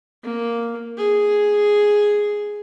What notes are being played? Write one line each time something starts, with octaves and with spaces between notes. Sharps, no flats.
A#3
G#4